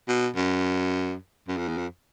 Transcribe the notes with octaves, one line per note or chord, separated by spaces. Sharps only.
B2
F#2
F#2
F2
E2
F2